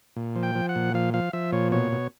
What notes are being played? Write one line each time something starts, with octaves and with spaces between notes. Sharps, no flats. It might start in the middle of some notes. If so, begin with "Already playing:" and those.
A#2
F3
G5
F3
F#5
A#2
F3 F5
F3 F5
F3 E5
A#2 C#5
B2 C#5
B2